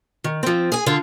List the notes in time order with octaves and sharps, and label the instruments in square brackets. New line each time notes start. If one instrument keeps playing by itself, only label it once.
[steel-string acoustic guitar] D#3
F3 C4
G#4 G#5
D3 F4